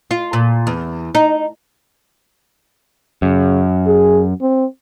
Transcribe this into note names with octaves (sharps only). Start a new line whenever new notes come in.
F4
A#2
E2
D#4
F#2 C#3
G#4
C4